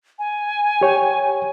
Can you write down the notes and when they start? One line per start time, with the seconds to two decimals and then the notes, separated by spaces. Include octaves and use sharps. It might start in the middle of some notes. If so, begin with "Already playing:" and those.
0.19 G#5
0.81 G4 C#5 G5